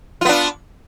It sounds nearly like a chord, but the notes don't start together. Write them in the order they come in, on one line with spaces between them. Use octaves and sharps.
F4 B3 D4